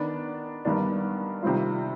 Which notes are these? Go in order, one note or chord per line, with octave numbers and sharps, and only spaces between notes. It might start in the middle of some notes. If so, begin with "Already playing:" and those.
Already playing: D#3 B3 D4
G2 D#3 B3 D4
C3 D#3 G3 C4 F4